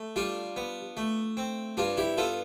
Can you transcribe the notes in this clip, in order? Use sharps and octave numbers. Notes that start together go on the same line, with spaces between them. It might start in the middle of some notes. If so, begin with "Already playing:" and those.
Already playing: A3
G3 D4 F4
B3
A3
C4
G2 D4 F4
E4 G4
B3 F4 A4